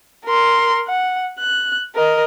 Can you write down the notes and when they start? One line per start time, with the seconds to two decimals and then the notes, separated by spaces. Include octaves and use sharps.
0.25 A#4 C6
0.87 F#5
1.38 F#6
1.95 A#4 D#5